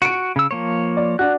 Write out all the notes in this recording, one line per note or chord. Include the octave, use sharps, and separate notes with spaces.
F#4 C#7 D7
C#3 E6
F3 A#3 C#5
D5
D4 F#4 F#6